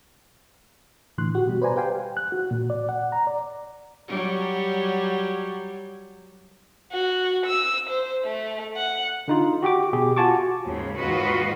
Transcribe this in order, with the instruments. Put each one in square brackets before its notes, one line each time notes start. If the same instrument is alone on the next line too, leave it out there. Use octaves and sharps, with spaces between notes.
[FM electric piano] A2 D3 E3 C6 F#6
F#4 G4
B2 G3
B4 C5 D5 G#5 A#5
G4 B4 F5 G5 G#5 C6
[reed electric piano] F#6
F#4
A#2
D5
F#5
A#5
D5
[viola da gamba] F#3 G3
[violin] F#4
E6
C5
A3
F#5
[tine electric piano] D3 D#4 F4
F#4 G4 G5 D6
B2 G4 G#4
F4 F#4 G#5 A5 C#6 D6
[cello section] D#2 G#2 C#3
D#2 G#2 F4 F#4 B4 D#5